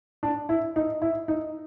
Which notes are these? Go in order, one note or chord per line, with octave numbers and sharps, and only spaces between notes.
D4
E4
D#4
E4
D#4